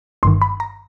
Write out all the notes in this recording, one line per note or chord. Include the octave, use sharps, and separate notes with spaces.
G1 G2 D#3 C6
B5
A#5